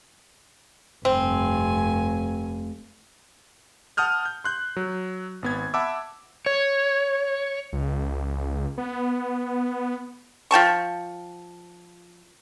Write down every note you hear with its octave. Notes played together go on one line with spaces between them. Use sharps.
F1 G2 C4 G#5
F#5 A5 D#6 F6 G6
G6
C6 F#6 G6
F#3
G#1 B3 G#6
E5 F#5 A5 B5 D6 E6
C#5
C#2
B3
F3 G5 A5 C#6